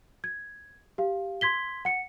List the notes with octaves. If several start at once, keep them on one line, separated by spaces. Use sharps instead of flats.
G#6
G4 F5
C6 G#6 B6 G7
F#5 C#7